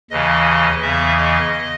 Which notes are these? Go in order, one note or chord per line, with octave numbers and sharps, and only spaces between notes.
D#2 C#3 E3 D#5
E2 C#3 E3 E5
D#5